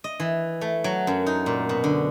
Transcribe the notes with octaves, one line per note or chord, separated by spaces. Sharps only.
D#5
E3
A3
F#3
F#2
D#4
A#2
B2
D3